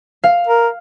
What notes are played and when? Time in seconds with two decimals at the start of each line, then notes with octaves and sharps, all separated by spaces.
0.24 F5
0.47 A#4